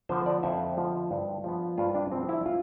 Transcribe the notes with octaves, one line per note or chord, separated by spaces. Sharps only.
D3 F3 B3 C5
D5
F2 E5
D3 F3 B3
G2
F3 B3
G2 F4
D4
F3 B3 C4
E4
F4